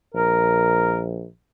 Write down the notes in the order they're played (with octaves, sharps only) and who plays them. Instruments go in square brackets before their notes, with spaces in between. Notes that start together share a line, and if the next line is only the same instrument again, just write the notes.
[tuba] A#1 [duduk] A#4